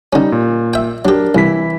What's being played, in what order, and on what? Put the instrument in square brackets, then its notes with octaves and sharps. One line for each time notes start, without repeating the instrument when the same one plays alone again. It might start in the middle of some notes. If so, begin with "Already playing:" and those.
[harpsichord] D3 C#4 [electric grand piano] G3 D#4
[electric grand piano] A#2
[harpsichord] E5 G5
[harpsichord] F#3 G4 [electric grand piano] D4 A#4
[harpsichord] C2 [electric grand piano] E3 E4 B6